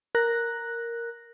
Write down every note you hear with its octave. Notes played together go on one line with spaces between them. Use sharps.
A#4 F#6 A#6